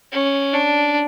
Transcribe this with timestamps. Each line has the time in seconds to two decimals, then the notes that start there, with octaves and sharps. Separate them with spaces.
0.12 C#4
0.54 D4